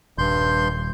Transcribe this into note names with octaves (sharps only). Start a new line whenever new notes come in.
D#1 G2 C6 G6